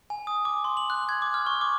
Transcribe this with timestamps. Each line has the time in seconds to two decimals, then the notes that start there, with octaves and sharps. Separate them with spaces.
0.10 G#5
0.27 D#6
0.45 D6
0.64 C6
0.77 F#7
0.90 F#6
1.09 G#6
1.22 D6
1.34 F6
1.47 C#6
1.61 D6